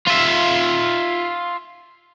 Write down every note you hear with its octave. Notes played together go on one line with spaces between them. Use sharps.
F4 E5